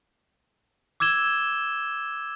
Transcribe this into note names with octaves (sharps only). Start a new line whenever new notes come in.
D6 E6 G#6 E7 G7